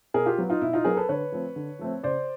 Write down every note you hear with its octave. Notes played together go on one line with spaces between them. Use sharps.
B2 G#4 A#4
F4 G4
F#3 B3
D#4 F4
B2 E4
D#4 F4
F#3 B3 G#4 A#4
A4 B4
D3 B4 C#5
F3 A3 C4
D3
F3 A3 C4
C#3 C5 D5